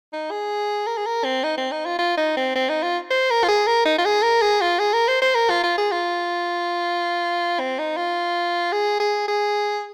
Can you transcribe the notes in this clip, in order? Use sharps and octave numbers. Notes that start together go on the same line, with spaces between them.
D#4
G#4
A#4
G#4
A#4
C4
D#4
C4
D#4
F4
F4
D#4
C4
C4
D#4
F4
C5
A#4
F4
G#4
A#4
D#4
F4
G#4
A#4
G#4
F4
G#4
A#4
C5
C5
A#4
F4
F4
G#4
F4
C4
D#4
F4
G#4
G#4
G#4